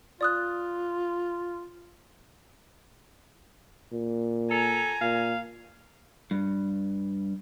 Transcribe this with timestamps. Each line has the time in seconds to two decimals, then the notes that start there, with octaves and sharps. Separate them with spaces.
0.21 F4 D5 D#6 F#6
3.92 A#2
4.51 A4 G#5 A#5
5.01 A#2 F5
6.31 G2